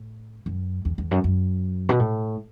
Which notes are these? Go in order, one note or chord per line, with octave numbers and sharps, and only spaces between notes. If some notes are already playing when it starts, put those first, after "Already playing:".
Already playing: A2
F#2
E2
E2
F#2
F#2
B2
A2